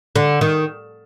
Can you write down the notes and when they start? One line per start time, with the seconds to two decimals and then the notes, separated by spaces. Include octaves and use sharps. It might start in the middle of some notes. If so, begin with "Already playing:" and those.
0.16 D3
0.41 D#3